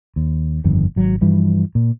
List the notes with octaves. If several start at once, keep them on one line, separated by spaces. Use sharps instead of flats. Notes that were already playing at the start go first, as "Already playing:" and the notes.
D#2
G1 F2 D#3
G#1 F#3
G2 E3 F3 G3
A#2